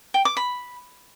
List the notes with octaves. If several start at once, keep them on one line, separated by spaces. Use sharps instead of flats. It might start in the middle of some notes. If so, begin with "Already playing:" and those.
G5
D6
B5